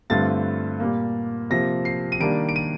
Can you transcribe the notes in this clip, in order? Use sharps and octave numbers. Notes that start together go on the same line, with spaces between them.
G2 D3 A3 C4 F4 A6
A#2 G3 A#3
C3 F3 A#3 A#6
C7
D#7
D#3 G3 A#3 D4 D7
D7
D#7